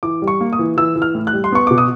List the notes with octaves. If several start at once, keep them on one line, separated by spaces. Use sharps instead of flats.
E3 D6
G3
C#6
A#3
D#6
E3
E3 E6
E3
F6
A2
F#6
G3
C6
B3 C#6
B2 D6
D#6